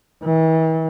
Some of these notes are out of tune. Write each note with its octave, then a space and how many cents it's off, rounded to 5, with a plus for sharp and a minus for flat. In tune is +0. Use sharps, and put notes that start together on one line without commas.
E3 -40